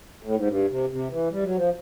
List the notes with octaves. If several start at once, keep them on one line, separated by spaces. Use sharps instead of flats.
A2
G#2
G2
C3
C3
E3
G3
F#3
F3